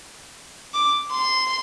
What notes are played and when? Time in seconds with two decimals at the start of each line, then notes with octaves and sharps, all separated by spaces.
0.73 D6
1.11 C6